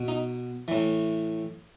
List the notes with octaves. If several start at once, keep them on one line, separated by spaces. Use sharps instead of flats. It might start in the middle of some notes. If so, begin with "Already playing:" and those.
Already playing: B2
D#4
A2 E3